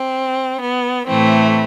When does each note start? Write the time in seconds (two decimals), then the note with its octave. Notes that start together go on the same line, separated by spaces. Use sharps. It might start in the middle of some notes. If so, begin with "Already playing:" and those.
Already playing: C4
0.62 B3
1.07 A2 E3 A3 C4